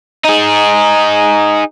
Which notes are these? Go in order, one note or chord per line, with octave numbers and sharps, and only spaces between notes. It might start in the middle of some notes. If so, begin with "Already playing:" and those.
D#4 G#4